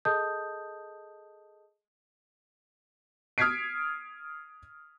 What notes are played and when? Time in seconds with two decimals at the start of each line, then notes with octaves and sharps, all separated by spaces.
0.05 G#4 A4 D#5 A5 D#6 G6
3.38 D#6 F6 G#6 B6 C7 D7